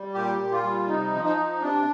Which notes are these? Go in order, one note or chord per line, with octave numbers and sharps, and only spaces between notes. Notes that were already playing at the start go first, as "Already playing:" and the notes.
Already playing: G3
A#2 G4
A#2
F4
G3
C3 D#4
F3
D#4
F3
C3 D4